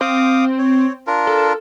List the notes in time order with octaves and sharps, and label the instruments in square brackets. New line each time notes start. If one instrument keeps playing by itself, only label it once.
[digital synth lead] C4 [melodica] F5 D6 D#6
[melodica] C#5
D4 F4 A#4
[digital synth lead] A4